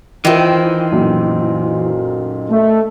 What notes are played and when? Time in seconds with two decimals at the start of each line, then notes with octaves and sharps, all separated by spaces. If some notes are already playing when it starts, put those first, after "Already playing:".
0.25 D#3 E3 C4 E4 F4 A#4
0.92 B1 F#2 A#2
2.50 A3